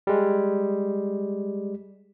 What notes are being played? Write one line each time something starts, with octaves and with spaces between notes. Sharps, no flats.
G3 G#3